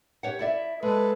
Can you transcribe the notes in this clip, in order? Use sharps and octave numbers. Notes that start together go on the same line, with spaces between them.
G4 C#5 F#5
E4 D5 E5
G#3 A4 B4